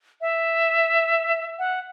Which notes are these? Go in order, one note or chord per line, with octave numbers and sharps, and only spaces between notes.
E5
F#5